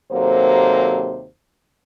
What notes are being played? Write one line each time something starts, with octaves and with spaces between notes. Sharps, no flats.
D#2 C3 F#3 A#3 A4 C5